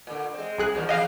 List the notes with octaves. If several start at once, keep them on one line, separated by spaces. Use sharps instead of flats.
A#2 D3
G#3 C4
C2 G#4 F#6
A#2 D#3 F3
E2 G#4 D#5 F5